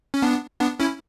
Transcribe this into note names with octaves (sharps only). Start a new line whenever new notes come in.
C#4
B3 D4
B3 D4
C#4 E4